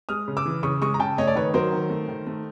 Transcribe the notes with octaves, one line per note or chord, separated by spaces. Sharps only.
G#3 D#6 F6
C#3
D6 E6
E3
C#3 C#6 D#6
G#3 C#6 D#6
A#5
C#3 G5 A5
A3 C#5 D#5
D5
D#3 B4 C#5
F#3 A#4 C5
D#3
A3
D#3
A3